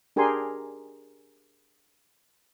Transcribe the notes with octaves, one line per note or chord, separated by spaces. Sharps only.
D4 G4 G#4 A#4 G#5 C6